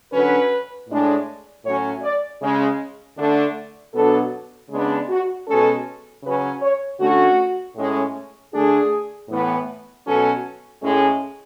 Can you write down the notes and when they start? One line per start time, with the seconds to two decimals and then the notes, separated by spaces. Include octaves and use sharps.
0.12 D3 F#3 C#4 B4
0.88 A2 G#3 D4
1.64 A2 F#3 C#4 C#5
2.02 D5
2.41 C#3 G#3 C#4
3.17 D3 A3 D4
3.93 B2 F#3 B3 D4 A4
4.70 C#3 G#3 B3 D4
5.08 F#4
5.46 B2 G#3 C#4 A4
6.23 C#3 F#3 C#4 B4
6.61 C#5
6.99 D3 A3 C#4 F#4
7.75 A2 G#3 C#4
8.53 D3 A3 D4 G#4
9.29 A2 E3 B3
10.05 B2 F#3 C#4 A4
10.82 A2 G#3 C#4